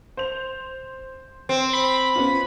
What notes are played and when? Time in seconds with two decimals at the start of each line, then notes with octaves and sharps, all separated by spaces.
0.17 C5 F7
1.49 C4
1.73 B5
2.16 B3 C#4 F4